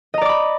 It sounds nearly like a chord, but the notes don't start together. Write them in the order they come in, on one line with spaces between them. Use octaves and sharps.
D#5 A#5 D5 D6 B5